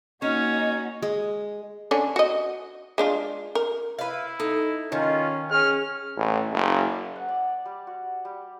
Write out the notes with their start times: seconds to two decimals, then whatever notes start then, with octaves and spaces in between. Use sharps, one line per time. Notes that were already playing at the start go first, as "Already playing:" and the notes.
0.22 A#3 C#4 D#4 F#4 C#5 D#5
1.02 G#3
1.91 D3 C#4 D4
2.16 F#4 D#5
2.98 G#3 D4 F4
3.55 A#4
3.99 E4 B4 F5
4.40 D#4 A4
4.92 D#3 C#4 F4 D#5
5.51 C#4 G#4 F6
6.17 A1
6.53 F#1
7.16 F#5
7.29 D5
7.65 G3
7.87 F#4
8.25 G3